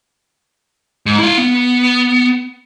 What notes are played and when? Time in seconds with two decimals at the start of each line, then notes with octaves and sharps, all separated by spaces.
1.06 G#2
1.19 E4 F5
1.38 B3